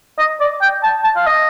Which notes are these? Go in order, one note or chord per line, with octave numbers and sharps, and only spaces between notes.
D#5
D5
G5
A5
A5
F5
D#5